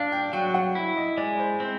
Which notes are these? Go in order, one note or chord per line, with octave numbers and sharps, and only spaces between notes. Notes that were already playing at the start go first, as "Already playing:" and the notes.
Already playing: D4 F5
G5
F#3 G5
F#5
E4
D#5
G#3 D5
C5
C4 C5